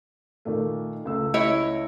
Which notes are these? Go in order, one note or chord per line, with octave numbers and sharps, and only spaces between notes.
A#2 D#3 A3
C#2 A3 E6
E4 C#5 D#5